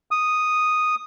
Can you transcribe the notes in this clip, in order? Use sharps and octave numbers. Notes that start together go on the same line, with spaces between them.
D#6